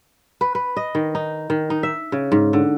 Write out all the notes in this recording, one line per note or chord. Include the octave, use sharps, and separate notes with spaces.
B4
B4
D#5
D#3
D#4
D#3
D#4
E5
C#3
G#2
D3